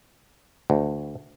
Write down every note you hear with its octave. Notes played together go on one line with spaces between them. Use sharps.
D2